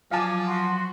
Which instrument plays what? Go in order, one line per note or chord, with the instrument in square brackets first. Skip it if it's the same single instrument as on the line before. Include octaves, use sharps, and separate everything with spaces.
[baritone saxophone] F3 [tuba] F#3 [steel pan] F5 A5 [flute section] G#5 D6
[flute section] F#4 C6